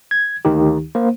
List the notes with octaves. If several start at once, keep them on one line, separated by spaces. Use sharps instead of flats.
G#6
D2 D#3 D#4 G4
A#3 C5